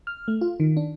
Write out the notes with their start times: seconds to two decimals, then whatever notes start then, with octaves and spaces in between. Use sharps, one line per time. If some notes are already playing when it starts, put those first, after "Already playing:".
0.07 F6
0.28 A3
0.41 F4
0.60 D#3
0.77 D4